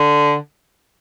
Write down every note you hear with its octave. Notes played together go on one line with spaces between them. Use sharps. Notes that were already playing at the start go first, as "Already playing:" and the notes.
Already playing: D3